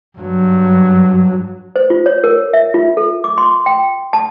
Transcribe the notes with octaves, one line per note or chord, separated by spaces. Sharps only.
G2 F#3
C5
F4
C#5
A#4
E5
F4
A4
D6
C6
G5
A5